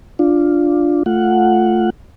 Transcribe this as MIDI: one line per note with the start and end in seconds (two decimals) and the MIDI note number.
0.19 1.03 62
0.19 1.03 65
1.06 1.90 57
1.06 1.90 65
1.06 1.90 78